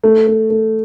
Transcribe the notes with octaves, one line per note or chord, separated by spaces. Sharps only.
A3
A3
A3